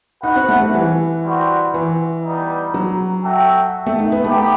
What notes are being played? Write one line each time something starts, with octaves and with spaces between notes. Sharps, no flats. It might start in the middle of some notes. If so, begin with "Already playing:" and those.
D#4 F#4 B4 F#5
C4
A3
G3
E3
G3 C4 F#4
E3
G3 B3 D#4
F#3
F#4 A4 E5 G5
A3
D#4
B3
A3 B3 D#4 G4